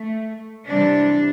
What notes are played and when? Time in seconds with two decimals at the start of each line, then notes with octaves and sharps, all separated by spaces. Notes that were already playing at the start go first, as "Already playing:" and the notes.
Already playing: A3
0.67 C3 E3 G3 D4